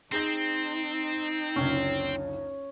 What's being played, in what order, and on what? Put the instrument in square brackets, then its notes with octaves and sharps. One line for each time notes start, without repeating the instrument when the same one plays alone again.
[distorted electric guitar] C4 [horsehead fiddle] D#4 [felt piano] G#4 G6 A#6
[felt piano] F#1 C#2 D3 [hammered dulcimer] C#4